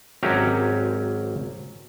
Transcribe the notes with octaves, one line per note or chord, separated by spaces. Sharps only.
G#1 F#3 C#4 G4 E5 A#5